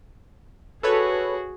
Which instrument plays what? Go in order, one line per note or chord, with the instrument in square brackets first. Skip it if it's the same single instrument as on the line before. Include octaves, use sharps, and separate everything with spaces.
[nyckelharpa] F#4 G#4 [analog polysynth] A4 B4 C#5